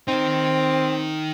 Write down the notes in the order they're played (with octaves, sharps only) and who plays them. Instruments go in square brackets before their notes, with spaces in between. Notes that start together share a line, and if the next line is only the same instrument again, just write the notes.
[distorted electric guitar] D#3 D#4 [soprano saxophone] C4